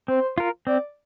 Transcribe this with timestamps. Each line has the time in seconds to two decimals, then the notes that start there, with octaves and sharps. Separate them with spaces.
0.08 C4 C5
0.38 F4 A#4
0.67 C4 D5